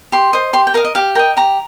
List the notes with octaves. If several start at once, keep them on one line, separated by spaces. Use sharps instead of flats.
G4 C6
C5 D#5
G4 C6
G5
A#4 D#5 F5
D#5
G4 F5
A#4 D#5 G5
G4 A#5